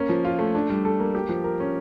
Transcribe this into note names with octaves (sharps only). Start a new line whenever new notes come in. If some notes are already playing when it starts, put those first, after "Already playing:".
Already playing: A#3 C#4
F3
F4
A3
D4
G3
A4
A#3
G4
F3
A#4
C#4